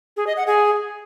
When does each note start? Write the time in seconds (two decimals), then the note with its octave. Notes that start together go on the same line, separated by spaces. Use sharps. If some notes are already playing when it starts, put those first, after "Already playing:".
0.17 G#4
0.27 D#5
0.37 F#5
0.47 G#4